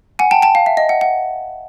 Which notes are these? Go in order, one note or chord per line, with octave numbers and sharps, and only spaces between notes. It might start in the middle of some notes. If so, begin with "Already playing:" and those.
F#5 G#5
G5 A5
G5 A5
F5
E5
D#5
F#5
F#5